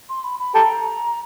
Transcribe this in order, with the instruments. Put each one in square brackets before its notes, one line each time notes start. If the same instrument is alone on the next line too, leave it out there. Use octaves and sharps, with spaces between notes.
[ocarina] C6
B5
B5
[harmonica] G4 A4 [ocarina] A#5